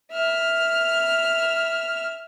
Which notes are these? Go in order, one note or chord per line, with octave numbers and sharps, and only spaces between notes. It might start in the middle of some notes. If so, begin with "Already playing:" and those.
E5 F6